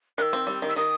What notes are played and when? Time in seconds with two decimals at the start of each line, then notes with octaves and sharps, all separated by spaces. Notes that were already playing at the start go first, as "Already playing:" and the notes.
0.18 D#3 E6 F#6
0.33 C4
0.47 G3
0.62 D#3
0.68 E6
0.76 D#3 D#6